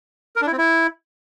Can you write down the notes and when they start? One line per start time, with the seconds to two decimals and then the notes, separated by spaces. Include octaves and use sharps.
0.36 A#4
0.41 D4
0.47 E4
0.52 C4
0.58 E4